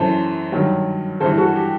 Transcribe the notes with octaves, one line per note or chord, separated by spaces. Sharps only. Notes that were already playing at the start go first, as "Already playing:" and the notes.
Already playing: F#2 E3 A4 C5
G2 D#3 F#3
G2 E3 A4 C5
F#4 A4
G4